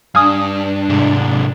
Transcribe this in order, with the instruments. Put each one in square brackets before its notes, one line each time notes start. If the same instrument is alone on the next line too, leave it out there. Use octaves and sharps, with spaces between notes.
[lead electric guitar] G2 [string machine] D4 [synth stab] F5 G#5 D#6
[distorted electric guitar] G#2 C3